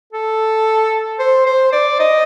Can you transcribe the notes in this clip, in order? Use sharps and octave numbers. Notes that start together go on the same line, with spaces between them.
A4
C5
C5
D5
D#5